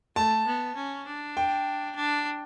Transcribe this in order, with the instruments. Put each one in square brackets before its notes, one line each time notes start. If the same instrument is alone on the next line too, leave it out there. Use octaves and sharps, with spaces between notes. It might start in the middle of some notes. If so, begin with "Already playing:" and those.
[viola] A3 [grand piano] A5
[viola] B3
C#4
D4
[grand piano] G5
[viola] D4